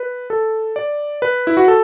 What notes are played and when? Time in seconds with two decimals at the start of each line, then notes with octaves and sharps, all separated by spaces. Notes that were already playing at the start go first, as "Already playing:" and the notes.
Already playing: B4
0.30 A4
0.76 D5
1.22 B4
1.47 E4
1.57 F#4
1.68 A4